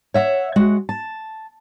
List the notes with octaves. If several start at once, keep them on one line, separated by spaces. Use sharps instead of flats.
C#5 E5 F#5
G#3 F#4
A5